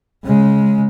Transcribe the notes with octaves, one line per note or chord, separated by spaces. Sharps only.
C#3 G#3